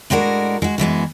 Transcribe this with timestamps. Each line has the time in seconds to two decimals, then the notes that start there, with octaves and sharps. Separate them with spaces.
0.10 A2 G#3 D4 F#4 A#4
0.62 G#3 F#4
0.78 F#2 E3 G#3 B3